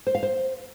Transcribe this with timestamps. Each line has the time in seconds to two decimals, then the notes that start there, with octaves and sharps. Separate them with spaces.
0.07 C5
0.15 F5
0.23 C5